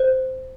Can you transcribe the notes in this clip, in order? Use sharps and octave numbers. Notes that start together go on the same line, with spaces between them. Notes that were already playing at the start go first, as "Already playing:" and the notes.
Already playing: C5